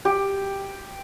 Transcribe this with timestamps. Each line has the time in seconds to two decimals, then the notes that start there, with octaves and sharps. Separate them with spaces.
0.05 G4